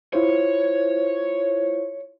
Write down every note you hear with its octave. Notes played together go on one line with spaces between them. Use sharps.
E4 F4 C5 C#5